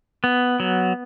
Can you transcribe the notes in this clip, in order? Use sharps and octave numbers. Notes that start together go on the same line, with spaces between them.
B3
F#3